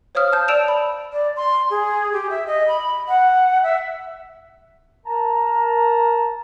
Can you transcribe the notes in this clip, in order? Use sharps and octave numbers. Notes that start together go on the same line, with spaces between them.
C5 C#5 F5 D#6 F6
A5 G6
D5 A5 E6 D7 E7 F7
B5
D5
C6
G#4
G4
E5
D#5
B5
F#5
E5
A#4 A5 A#5